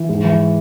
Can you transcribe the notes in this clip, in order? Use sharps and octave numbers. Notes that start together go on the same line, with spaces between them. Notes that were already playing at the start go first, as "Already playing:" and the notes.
Already playing: E3
G#2
E3